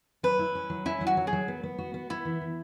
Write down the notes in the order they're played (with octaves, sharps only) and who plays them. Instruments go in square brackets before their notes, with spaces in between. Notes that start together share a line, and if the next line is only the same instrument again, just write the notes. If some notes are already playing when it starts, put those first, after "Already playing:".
[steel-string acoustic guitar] F#3 [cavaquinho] B4
[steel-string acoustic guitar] E4
C#4
F#3
[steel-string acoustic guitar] C#4 [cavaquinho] E4
[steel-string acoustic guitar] F#3
[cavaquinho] F#4
[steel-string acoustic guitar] F#3
[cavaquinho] G#4
[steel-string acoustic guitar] F#3
B3
B3
F#4
B3
[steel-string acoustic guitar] B3 [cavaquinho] E4
[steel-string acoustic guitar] E3
E3